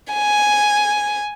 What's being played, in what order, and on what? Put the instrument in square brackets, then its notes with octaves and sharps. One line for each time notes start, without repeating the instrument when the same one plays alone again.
[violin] G#5